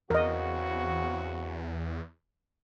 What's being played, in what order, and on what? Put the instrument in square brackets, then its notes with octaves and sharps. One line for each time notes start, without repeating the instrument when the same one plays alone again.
[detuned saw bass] E2 [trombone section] C#3 C4 F#4 [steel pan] A#4 D#5